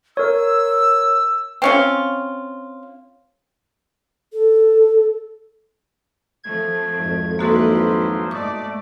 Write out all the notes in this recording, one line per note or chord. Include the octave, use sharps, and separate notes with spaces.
A#4 C#5 E6
C4 C#4 F4
A4
F3 A3 C4 G#6
G#1 F2
F3 F#3 A#3 E4 F#4 A4 B4 C5
G#2 B2 A3 D5 D6 D#6